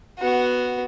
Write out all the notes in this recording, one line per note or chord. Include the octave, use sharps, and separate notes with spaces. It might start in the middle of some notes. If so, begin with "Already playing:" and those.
B3 F#4